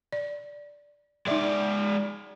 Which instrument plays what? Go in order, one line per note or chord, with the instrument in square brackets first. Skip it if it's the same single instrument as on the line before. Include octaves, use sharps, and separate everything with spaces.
[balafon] D5
[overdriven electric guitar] G#3 D5 [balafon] D#4 E5